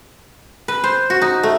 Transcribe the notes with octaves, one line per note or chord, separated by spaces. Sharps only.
B4
C5
F#4
D#4
A3